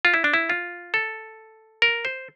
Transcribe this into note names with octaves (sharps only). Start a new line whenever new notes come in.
F4
E4
D4
E4
F4
A4
A#4
C5